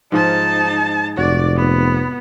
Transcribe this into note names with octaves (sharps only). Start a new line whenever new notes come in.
G#2 F3 D#4 A5
F1 F#4 D5
B3